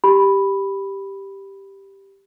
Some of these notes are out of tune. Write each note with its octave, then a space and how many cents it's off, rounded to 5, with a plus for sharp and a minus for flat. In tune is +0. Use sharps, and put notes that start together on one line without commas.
G4 +0 B5 +0